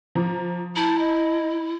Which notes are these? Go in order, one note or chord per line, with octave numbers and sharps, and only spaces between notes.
F3 A#5 D6
E4 A5 A#5 G6
D#5